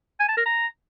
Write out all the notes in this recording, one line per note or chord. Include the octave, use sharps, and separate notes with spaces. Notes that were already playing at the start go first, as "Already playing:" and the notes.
G#5
A5
A#4
A#5